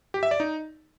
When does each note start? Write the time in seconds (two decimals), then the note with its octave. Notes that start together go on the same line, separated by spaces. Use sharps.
0.14 G4
0.23 E5
0.31 D5
0.40 D#4